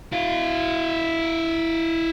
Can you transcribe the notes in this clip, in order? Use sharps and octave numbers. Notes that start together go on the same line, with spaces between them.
E4 F5